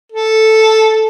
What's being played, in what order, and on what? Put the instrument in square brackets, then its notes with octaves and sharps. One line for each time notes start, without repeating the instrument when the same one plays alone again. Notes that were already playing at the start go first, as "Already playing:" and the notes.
[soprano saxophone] A4